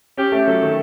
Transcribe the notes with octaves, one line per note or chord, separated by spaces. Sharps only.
C#4 G4
A3
F#3 A4
D#3